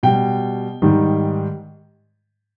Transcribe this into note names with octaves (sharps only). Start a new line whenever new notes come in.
B2 G3 G5
G#2 D#3 G3